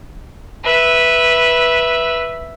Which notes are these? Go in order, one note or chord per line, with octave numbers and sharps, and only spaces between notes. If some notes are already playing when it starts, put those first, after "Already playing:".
B4 E5